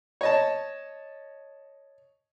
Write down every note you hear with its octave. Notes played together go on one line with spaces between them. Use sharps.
C#5 D#5 A5